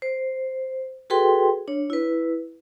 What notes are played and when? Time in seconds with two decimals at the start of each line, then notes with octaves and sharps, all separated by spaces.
0.02 C5
1.10 F#4 G#4 A4 B4 G5 C6
1.68 D4 C#5
1.90 E4 B4